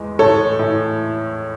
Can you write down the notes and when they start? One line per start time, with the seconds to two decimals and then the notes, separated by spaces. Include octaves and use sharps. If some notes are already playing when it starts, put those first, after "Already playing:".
Already playing: E2 G#3
0.19 A2 A4 C#5
0.59 A2